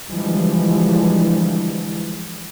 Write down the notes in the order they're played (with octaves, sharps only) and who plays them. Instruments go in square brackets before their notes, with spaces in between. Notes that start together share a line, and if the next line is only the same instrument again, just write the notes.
[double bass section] D3 E3 F3 G3 G#3